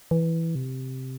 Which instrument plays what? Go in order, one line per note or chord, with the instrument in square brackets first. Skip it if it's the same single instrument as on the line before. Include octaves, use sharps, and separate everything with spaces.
[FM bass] E3
C3